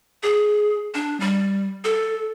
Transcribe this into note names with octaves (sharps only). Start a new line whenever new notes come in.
G#4
D4
G3
A4